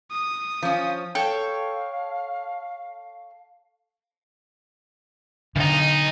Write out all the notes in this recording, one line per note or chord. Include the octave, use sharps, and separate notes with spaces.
D#6
F3 C#4 F5
A4 C#5 F5 G5
B1 D3 D#4